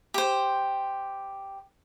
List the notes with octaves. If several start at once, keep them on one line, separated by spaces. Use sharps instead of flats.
G4 C5